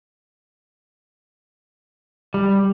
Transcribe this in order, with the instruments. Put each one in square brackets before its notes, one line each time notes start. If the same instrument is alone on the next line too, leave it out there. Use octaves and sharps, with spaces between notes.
[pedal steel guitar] G3